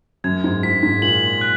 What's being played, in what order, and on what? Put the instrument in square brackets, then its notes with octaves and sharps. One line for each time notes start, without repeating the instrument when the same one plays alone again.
[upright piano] F#2 [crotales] G#6
[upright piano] G#2
[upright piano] G#2 [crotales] B6
[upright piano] G#2
[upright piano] A#2 [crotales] F#7
[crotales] F#6